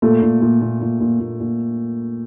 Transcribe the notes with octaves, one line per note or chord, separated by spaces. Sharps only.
A#2 A3
A#2
A#2
A#2
A#2
A#2
A#2
A#2